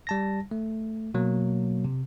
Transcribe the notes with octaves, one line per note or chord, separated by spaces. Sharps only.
G3 A5 A#6
A3
B2 F#3 A#3
C3